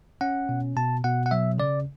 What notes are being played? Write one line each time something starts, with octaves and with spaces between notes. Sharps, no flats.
C#4 F#5
B2
B2 A5
B2 F#5
F#5
F#3 E5
C#3 D5